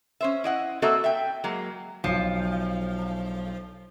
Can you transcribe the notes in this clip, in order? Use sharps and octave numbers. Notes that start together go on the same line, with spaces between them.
C#4 C5 E5
E4 D#5 F#5
A#3 C4 F#4 A4 D#5 E5
E5 G5
F#3 G#3 A#3
B1 F3 C7